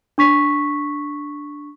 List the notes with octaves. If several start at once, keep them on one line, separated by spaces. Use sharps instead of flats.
D4 C#6 B6